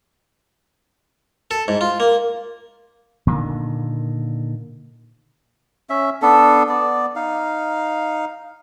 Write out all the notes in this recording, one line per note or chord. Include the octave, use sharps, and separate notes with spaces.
A4
G#2
F4
A#3
A#2 D3 D#3
C#4 E5
B3 D4 A4
B3 D5
D#4 F5